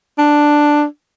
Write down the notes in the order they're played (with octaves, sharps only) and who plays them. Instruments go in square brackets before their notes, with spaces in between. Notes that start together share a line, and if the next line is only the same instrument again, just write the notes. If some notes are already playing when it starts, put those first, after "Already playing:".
[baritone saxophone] D4